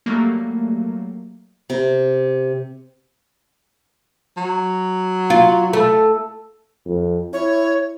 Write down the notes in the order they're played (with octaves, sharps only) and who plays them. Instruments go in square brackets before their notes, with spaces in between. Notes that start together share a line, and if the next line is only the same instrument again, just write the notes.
[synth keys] F#3 G3 A3 A#3
[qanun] C3
[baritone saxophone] F#3
[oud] F4
A3
[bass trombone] F2
[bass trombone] E4 [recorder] C#5